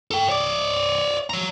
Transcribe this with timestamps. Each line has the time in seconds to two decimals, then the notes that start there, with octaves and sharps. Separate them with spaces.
0.11 A4 G5
0.29 C#5 D5
1.30 C#5 A#5